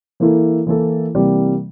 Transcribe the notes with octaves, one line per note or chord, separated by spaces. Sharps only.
E3 A#3 E4 A4
E3 A#3 E4 A4
C3 E3 G3 A#3